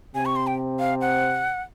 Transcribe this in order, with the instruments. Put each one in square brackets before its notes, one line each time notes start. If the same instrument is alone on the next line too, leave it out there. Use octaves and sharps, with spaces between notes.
[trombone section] C3 C4 [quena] G#5
[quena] C#6
C6
G5
F5
F#5